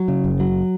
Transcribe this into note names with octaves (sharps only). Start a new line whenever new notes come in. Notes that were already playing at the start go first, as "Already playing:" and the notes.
Already playing: F#3
C#3
F#1
F#3